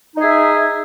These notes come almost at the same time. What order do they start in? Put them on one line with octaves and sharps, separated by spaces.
D#4 G#4 E5